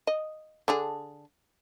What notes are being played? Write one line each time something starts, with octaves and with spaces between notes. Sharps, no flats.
D#5
D3 D4 G#4